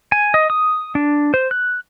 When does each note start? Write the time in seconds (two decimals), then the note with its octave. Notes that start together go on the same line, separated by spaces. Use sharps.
0.12 G#5
0.34 D#5
0.50 D#6
0.95 D4
1.34 C5
1.51 F#6